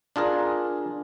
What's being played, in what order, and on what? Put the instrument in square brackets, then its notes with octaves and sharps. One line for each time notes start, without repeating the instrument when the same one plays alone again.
[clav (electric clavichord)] D4 F4 G#4 A#4